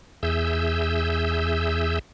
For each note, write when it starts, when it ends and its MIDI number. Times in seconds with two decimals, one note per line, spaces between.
0.23 1.99 40
0.23 1.99 68
0.23 1.99 76
0.23 1.99 88
0.23 1.99 91